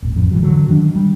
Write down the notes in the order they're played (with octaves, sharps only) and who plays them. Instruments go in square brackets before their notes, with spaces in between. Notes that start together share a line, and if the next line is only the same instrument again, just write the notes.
[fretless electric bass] D#1 G#1
A1 F2
G#2 E3 F#3
D3 F#3
D#3 F#3 C4 D4
G3